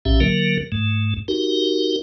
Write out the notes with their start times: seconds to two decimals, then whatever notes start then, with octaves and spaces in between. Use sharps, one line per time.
0.05 A#1 A2 C#4 G4 E5
0.20 D3 F#3 A#3 A#4
0.72 G#2 A3
1.28 D#4 F#4 G4 A#4